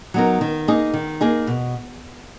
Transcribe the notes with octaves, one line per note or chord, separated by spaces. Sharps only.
F#3 B3 D#4 A#4
D#3
A#3 D#4 G#4
D#3
A#3 D#4 G#4
B2